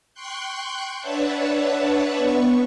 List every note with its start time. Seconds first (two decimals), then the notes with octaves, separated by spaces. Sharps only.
0.14 G5 C6 C#6 F#6 G6
1.00 D4 B4 C#5 E5 F#5 A5
2.16 B3 C#6